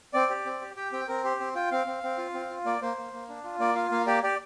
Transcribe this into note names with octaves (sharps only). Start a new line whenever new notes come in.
C4 D5
G4
C4
G4
G4 G5
C4 G5
C4 A#4
G4 C5
C4 C5
F4 G5
C4 F5
C4
C4
F4
C4
F4
A#3 D5
A#3 C5
A#3
A#3
D4
F4
A#3 D5
F4 F5
A#3 F5
G4 D5
G4 D5